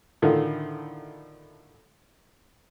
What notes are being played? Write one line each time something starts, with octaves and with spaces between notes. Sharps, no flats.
A2 D3 D#3 F4